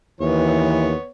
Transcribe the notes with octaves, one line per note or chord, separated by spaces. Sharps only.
D#2 E3 B3 C#5